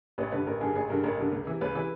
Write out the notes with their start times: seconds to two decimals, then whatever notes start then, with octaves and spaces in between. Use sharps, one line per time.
0.18 A1 B4
0.32 G2 D3 B4
0.47 A1 A#4
0.61 G2 D3 G#4
0.75 A1 G#4
0.90 G2 D3 A#4
1.04 A1 A#4
1.18 G2 D3
1.32 C#2
1.47 C3 E3
1.61 C#2 B4
1.75 C3 E3 B4